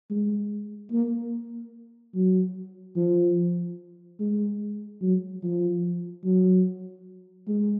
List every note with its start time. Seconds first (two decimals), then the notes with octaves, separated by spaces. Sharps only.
0.10 G#3
0.91 A#3
2.15 F#3
2.96 F3
4.19 G#3
5.01 F#3
5.43 F3
6.24 F#3
7.48 G#3